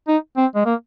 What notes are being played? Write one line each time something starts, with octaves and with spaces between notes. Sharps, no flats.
D#4
C4
G#3
A#3